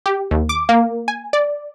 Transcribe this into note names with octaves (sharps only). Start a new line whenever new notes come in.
G4
D#2
D6
A#3
G#5
D5